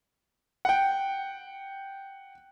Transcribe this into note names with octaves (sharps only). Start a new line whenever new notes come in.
F#5 G5